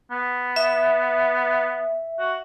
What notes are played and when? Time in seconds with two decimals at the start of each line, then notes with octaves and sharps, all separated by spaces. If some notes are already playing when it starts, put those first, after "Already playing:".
0.11 B3
0.56 E5
2.19 F#4